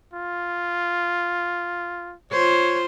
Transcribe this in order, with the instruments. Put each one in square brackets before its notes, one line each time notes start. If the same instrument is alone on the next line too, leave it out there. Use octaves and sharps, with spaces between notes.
[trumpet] F4
[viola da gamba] F4 C5 [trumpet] C#5